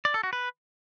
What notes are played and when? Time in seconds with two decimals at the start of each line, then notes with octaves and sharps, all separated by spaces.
0.05 D5
0.14 A4
0.23 F#4
0.33 B4